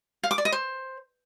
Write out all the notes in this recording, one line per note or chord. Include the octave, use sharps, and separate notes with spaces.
F5
D6
D5
D#5
C5